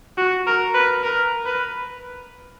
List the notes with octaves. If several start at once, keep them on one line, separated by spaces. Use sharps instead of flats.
F#4
A#4
B4
A#4
B4